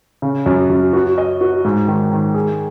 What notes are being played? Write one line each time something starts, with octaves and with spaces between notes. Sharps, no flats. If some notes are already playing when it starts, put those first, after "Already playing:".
C#3
F#2
F#2
F#4
D#5
F#4
G#2
D#3
D#3
G#4